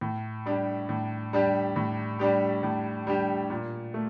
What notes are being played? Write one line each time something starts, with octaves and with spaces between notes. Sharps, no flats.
A2
G3 D4 G4
A2
G3 D4 G4
A2
G3 D4 G4
A2
G3 D4 G4
A#2
A3